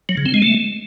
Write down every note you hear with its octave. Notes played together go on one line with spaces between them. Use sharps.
F#3
C#3
C4
G#3
A3